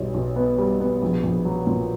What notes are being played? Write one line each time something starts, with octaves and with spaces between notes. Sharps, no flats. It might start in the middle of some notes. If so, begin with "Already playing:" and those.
Already playing: B1 G3
B1
B3
G3
B3
A#1
A#1
F#3
A#2